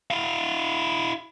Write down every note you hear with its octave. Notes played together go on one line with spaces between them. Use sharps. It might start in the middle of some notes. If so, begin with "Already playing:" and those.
E4 F5